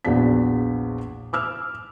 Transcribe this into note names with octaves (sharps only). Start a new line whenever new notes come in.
A#1 E2 F#4 D5 F#5 B6
D6 E6 F6